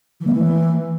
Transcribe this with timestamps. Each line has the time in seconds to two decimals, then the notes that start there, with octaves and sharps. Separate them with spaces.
0.21 E3
0.27 A#3
0.33 E3